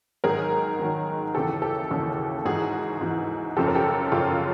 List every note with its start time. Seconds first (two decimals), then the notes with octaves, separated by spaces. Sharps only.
0.24 G#2 D#3 F#3 G#4 A#4
0.79 G#2 D#3 F#3
1.35 D#2 C#3 E3 G4 A4
1.62 G4 A4
1.90 D#2 C#3 E3 F#4 G#4
2.45 G#2 E3 F#4 G#4
3.01 G#2 E3
3.56 F#2 C#3 F3 G4 A4
3.68 A#4
3.75 G4 A4
4.12 F#2 C#3 F3 F4 G4